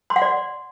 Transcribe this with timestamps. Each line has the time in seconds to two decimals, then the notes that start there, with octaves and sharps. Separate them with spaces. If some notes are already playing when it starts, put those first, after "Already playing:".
0.10 C6
0.16 F#5
0.22 D5